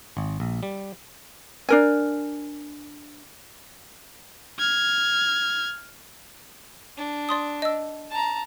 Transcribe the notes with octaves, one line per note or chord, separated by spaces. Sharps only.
G#1
A#1
G3
D4 A#4 G#5
F6 G#6
D4
D5 C6 D#6
D#5 E6
A5 A#5